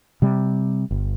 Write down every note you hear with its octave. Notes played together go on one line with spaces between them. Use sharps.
C3 G3
G1